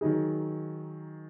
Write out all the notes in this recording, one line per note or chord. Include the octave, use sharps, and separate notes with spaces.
D#3 F#3 D#4 G#4